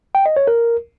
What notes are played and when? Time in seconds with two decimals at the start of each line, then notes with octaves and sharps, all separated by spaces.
0.15 G5
0.26 D#5
0.37 C#5
0.47 A#4